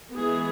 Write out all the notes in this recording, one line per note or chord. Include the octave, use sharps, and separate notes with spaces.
E3 G#3 B3 G#4